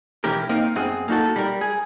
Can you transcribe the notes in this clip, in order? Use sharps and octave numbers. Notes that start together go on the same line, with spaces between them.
B1 E3 C#4 G4 A#4
A#3 C4 D#4 A#4
F#2 B3 C4 G#4
A#3 D#4 F#4 A4
G3 A#4
G#4